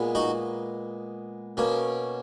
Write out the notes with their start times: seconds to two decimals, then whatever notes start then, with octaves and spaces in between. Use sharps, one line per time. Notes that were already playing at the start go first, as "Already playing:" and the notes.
Already playing: A#2 G#3 B3
0.15 D#4 F#4
1.57 B2 A#3 C#4